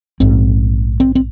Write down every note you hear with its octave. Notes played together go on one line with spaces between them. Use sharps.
A#1 G#2 C4
C4
C4